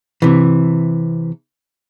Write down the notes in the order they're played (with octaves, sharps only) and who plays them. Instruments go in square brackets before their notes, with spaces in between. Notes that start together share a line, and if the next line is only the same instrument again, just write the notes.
[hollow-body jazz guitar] C3 E3